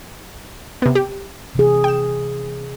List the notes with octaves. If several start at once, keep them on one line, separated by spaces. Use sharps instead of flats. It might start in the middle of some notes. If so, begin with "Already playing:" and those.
C3 B3
G4
C3 E3 G#4
G5 E7